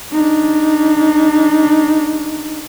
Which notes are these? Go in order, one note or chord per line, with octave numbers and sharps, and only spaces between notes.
D4 D#4